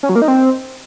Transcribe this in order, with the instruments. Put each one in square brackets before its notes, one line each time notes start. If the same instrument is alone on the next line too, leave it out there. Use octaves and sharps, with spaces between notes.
[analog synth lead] C#4
F#3
A#3
D#4
C4